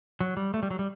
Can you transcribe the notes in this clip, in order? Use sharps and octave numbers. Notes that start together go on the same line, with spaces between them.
F#3
G3
A3
G3
F#3
G3